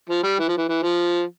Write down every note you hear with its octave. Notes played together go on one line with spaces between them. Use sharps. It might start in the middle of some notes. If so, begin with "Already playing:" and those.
F3
G3
E3
F3
E3
E3
F3